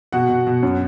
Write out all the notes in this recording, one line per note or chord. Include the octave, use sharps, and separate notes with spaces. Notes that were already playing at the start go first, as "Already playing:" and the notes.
B2 F#4 F#5
B2
B2
F#2